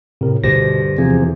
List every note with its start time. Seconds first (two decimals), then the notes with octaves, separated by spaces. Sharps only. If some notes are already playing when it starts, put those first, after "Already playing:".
0.21 A2 C3 A#4
0.44 D2 G2 B2 G4 C5 A#6
0.98 E2 C3 F3 C4 G#4